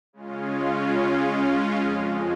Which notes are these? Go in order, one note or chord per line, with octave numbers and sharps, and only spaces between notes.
C#3 G#3 C#4 F4
F2 F3 G#3